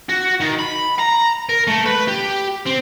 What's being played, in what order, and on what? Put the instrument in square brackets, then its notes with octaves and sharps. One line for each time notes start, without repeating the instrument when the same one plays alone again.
[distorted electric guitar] F#4
D#3
B5
A#5
A#4
A3
B4
G4
C4